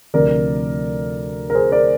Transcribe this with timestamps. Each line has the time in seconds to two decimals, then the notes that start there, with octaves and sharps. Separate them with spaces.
0.14 D2 C3 F3 A#4 D5
1.50 A#4
1.55 G#4 C5
1.72 A#4 D5